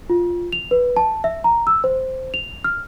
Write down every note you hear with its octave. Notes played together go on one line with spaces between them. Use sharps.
F4
F7
B4
A5
E5
A#5
E6
C5
F7
F6